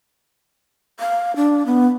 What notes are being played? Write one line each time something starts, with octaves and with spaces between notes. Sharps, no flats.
F5
D4
B3